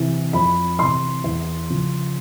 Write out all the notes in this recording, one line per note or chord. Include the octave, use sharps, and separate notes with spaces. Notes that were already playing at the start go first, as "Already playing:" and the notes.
Already playing: C3 E3
F2 B5
C3 E3 C6
E2
C#3 F3